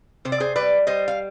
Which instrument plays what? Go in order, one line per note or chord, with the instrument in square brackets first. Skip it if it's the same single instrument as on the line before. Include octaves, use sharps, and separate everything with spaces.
[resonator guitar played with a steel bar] C3 C5
D5
G#4 C5
G3 B4 D5
G3 C5 D#5
F5